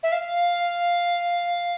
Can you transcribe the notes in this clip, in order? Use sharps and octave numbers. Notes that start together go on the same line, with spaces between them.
E5
F5